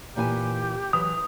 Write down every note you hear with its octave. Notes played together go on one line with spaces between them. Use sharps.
A#2 E3 G4 G#5
E3 F#3 D#6